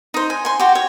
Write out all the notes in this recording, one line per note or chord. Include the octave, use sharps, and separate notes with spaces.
D#4 C5
G#5
G#5 C6
F#4 G4
C#5